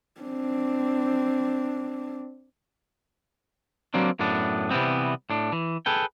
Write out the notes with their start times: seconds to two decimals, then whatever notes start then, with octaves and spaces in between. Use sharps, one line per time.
0.21 C4 D4
3.94 F#3 G3 A#3 C4 D4
4.19 F#2 A2 B3 D4
4.71 C3 E3 G3 A3 B3 C4
5.30 A2 D4
5.52 E3
5.86 G#4 A4 B4 G5